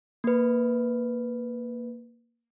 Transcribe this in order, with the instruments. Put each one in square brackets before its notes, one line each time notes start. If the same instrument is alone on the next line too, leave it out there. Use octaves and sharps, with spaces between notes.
[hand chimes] A#3 B4